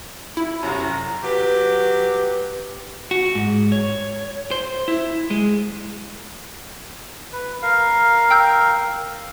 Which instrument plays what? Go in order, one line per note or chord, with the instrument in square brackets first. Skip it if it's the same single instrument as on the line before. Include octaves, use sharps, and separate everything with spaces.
[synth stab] E4
[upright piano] F1 C2 F#2 [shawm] A#5
[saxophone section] F#3 G4 [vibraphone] B4
[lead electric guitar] F#4
G#2
C#5
C5
E4
G#3
[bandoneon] B4
A#4 F5
[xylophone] G5 E6 G6